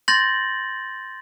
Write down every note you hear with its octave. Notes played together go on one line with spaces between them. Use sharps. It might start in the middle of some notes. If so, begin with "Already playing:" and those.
C6 G6 A6 A#6 F#7